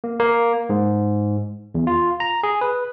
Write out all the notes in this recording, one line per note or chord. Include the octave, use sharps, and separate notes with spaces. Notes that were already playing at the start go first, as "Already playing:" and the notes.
A#3
A#3
G#2
E2
F4
A#5
G#4
B4